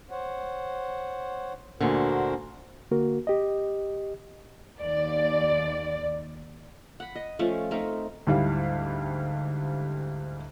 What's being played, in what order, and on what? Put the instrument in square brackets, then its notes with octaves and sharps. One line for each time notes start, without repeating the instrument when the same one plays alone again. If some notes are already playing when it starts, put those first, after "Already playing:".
[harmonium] C5 C#5 F#5
[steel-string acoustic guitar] D2 A#2 D3 [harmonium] F#4 A#4 C5
[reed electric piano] D3 A#3 F#4 A#4
G4 D#5
[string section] D#2 D5
[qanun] F#5 B5
D#5
F3 A3 C#4
A3 C4 D#4 A#4
[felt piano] D2 G#2 G3 E4 F5